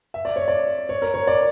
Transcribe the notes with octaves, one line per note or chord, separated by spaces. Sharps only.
E5
D5
C#5
D5
C#5
A#4
C#5
D5